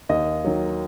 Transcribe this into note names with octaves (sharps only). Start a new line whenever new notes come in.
D#2 D#5
D#3 F#3